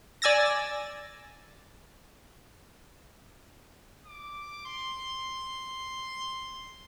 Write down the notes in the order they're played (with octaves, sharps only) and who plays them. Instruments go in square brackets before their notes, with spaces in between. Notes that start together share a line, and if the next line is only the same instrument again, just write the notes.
[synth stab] D5 G#5 E6 A6 A#6
[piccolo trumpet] D6
C6